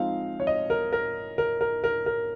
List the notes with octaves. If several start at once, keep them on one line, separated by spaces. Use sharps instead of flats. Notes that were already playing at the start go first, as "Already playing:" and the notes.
Already playing: F3 G#3 C4 D#4 F5
C#5
D#5
A#4
A#4
A#4
A#4
A#4
A#4